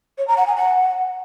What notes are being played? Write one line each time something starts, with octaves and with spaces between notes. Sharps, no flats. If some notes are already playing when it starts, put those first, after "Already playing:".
C#5
A#5
F#5
G#5
F#5